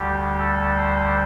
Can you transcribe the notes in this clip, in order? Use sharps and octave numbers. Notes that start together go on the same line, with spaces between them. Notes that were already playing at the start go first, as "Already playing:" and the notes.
Already playing: D2 D3 G3 G4
A4
A4 C5